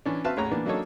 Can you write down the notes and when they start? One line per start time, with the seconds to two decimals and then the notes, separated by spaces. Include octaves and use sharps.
0.06 E3 C#4 D4
0.24 C4 F#4 B4 E5 F5 A5
0.37 A1 E2 C#5 A#5
0.51 E3 A#3 B3 D4
0.66 F#3 A#3 D4 D#4 A4 C#5